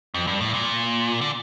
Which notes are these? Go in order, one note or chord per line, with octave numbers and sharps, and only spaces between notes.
F2
G2
A2
A#2
D3